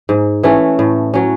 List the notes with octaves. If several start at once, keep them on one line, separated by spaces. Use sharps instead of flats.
G#2
E3 A3 C#4
A2
F#3 C#4